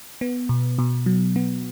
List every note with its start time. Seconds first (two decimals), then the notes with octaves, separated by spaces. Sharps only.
0.21 B3
0.49 B2
0.79 B2
1.06 F#3
1.36 B3